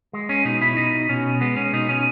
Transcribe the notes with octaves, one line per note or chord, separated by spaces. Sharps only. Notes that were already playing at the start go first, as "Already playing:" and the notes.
G#3
C#4
B2 D#4
E4
B2 D#4
B2 C#4
G#3 B3
C#4
B2 D#4
C#4